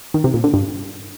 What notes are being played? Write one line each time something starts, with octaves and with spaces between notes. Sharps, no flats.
D#3
C3
A#2
D3
G2